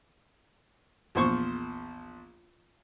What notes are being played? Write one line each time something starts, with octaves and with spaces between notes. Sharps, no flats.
A#1 E2 C5 C#6